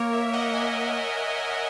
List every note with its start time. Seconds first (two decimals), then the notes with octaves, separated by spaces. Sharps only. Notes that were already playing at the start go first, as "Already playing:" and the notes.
Already playing: A#3 A#4 C#5
0.13 C#5 E5
0.33 D#5 F#5
0.53 E5 G#5